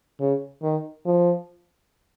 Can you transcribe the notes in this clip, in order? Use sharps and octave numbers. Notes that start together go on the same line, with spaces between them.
C#3
D#3
F3